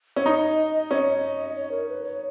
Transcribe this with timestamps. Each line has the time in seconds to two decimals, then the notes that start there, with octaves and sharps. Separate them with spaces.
0.16 C#4
0.26 D#4 D#5
0.91 C#4
1.49 D#5
1.56 C#5
1.72 A#4
1.89 B4
2.04 C#5